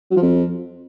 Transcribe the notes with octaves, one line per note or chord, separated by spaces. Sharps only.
F#3
F3
F2